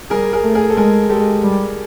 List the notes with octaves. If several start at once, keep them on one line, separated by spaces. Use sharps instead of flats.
G3 G#4 A#4
G#4 A#4
A3
G#4 A#4
A4
G#3 G#4 A#4
G#3 G4 A4
G3